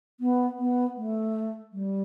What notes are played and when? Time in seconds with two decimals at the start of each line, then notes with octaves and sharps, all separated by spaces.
0.20 B3
0.59 B3
0.97 A3
1.73 G3